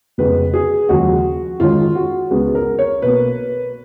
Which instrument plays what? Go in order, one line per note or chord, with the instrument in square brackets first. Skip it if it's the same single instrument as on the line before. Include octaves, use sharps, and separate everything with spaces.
[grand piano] F1 F2 C#3 G#3 B3 B4
G#4
D#2 C#3 F3 G#3 F#4
G#2 D#3 G#3 C#4 F4
F#4
C#2 C#3 G#3 B3
A#4
C#5
B1 B2 A#3 B4